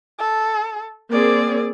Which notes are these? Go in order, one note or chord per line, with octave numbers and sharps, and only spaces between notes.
A4
A#3 C4 G#4 D5